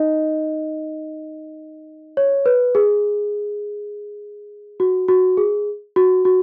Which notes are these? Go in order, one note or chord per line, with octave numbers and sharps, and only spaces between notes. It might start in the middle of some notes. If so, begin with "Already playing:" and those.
Already playing: D#4 D#5
C#5
B4
G#4
F#4
F#4
G#4
F#4
F#4